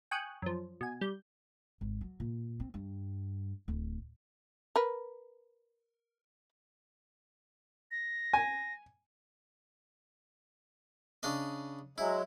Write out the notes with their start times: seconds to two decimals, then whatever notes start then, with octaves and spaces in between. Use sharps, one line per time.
0.11 G5 G#5 C#6 D#6 F#6
0.42 F#2 F3
0.81 B2 G#5
1.01 G3 G6
1.81 G#1
2.01 F#3
2.20 A#2
2.60 C4
2.74 G2
3.68 D1
4.76 A#4 B4
7.91 A#6
8.33 G#5
11.23 C#3 D4 D#5
11.98 F#3 G#3 E4